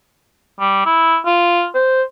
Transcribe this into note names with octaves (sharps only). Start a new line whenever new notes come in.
G3
E4
F4
C5